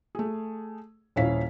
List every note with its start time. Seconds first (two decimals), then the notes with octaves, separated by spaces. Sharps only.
0.15 A3 G#4
1.16 D#1 A#1 C#4 E4 F5 B6